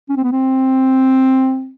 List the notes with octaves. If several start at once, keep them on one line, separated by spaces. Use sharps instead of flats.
C#4
C4
B3
C4